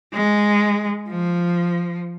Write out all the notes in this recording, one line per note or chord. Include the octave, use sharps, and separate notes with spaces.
G#3
F3